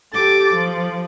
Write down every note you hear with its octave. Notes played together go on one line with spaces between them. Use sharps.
G4 A4 D6 A6
F3